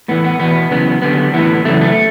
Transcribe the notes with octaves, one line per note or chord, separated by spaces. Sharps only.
A2 E3 B3
B3
E2 B2 B3
F#2 C#3 E3 B3
F#2 D3 B3
A2 E3 B3
F#2 C#3 E3 A3
A3